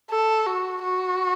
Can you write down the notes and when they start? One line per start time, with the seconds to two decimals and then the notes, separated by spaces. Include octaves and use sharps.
0.10 A4
0.46 F#4
0.82 F#4